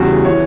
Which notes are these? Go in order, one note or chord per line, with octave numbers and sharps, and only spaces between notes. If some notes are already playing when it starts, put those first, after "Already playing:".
Already playing: E2 C#3 G3 F#4
E3 C#5